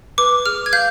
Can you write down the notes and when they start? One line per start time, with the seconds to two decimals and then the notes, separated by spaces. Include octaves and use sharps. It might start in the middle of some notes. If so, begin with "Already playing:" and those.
0.18 B4 D6
0.46 G#4 F6
0.66 G#6
0.73 F5 G6